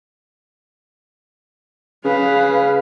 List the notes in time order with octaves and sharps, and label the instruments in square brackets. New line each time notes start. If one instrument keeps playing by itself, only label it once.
[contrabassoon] C#3 [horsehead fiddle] B4 F5